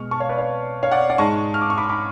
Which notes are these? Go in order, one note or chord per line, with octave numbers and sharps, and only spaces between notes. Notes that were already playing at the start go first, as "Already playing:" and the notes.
Already playing: B2 G#3 C#6 F6
A5 C#6
C#5 F5
B4 D5
C#5 F5
C#5 F5
D5 F#5
D5 F#5
G#2 G#3 A5 C#6
F6
D6
C#6
B5 D6
B5 D6